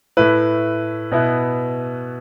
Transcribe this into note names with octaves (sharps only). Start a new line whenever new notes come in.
A2 A3 E4 B4
B2 B3 E4